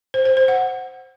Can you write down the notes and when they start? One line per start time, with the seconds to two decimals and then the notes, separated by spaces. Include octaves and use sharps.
0.14 C5
0.25 C5
0.37 C5
0.48 F#5